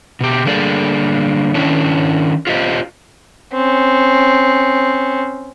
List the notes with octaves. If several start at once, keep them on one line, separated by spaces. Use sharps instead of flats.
B2 G4
D3 G3 A#3 G#4 D5
D#3 C#4 D4 E4
F4 G4 C5 D#5
C4 C#4